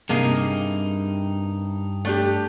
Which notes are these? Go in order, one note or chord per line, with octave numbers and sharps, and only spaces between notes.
G2 C3 A#3 D#4 G#4
A3 D4 G4